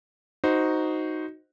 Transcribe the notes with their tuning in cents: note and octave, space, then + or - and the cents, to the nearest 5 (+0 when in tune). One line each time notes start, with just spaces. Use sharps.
D#4 +0 F#4 +0 C5 -10